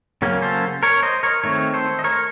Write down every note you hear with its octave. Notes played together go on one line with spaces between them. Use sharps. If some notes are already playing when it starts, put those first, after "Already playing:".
C#3 F#3 A#3 C#4
A4 C5
A#4 C#5
C5 D#5
A#4 C#5
D#3 A3 C4 A#4 C#5
A4 C5
D#5
A#4 C#5